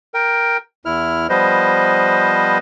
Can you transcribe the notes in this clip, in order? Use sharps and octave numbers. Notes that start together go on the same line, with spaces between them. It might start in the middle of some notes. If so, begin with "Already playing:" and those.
A#4 G5
E2 E4 F6
F3 G3 B3 B4 C5 D#5